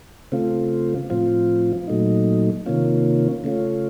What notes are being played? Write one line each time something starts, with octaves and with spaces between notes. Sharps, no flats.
C#3 A3 C4 F4
A2 F3 C4 F4
A#2 F#3 A3 D#4
C3 D#3 A#3 C#4 F4
C#3 A3 C#4 F4